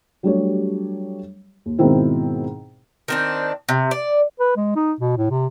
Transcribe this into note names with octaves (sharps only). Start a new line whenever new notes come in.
F#3 G3 A3 D4 G4 C#5
D#2
G#2 B2 D#3 C4 E4
D#3 C4 D4
C3
D5
B4
G#3
D#4
B2
A2
C3